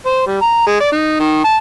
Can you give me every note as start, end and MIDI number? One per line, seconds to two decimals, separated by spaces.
0.06 0.23 72
0.27 0.40 55
0.41 0.62 82
0.66 0.77 56
0.80 0.92 74
0.92 1.18 63
1.20 1.44 51
1.44 1.56 81